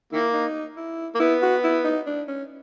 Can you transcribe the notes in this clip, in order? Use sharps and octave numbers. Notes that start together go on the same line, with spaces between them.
D#3 A#3 E4
D#4
E4
A#3
B3 E4
F#4
E4
D#4
D4
C#4